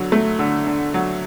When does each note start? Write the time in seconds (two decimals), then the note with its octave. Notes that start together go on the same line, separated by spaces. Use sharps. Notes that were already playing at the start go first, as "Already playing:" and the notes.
Already playing: D3 F#3
0.12 A3
0.39 D3
0.67 D3
0.94 F#3